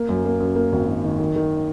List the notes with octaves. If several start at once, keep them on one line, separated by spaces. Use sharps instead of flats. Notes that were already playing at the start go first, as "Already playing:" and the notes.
Already playing: A#3
F#2
A#3
F#2
A#3
G#1
D#3
D#3
D#3
D#3